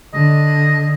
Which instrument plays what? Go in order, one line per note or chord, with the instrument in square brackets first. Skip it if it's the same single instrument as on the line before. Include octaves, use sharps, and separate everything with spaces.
[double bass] D3 [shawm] D#5